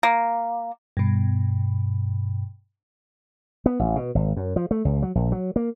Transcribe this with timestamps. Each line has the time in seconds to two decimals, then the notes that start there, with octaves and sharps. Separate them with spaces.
0.03 A#3
0.97 G2 B2
3.66 B3
3.79 A1
3.96 B2
4.15 G#1
4.37 F#2
4.56 F3
4.71 A3
4.85 C#2
5.02 F#3
5.15 A#1
5.32 F#3
5.56 A#3